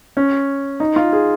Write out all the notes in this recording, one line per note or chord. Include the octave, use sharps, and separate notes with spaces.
C#4
D#4
F4
G#4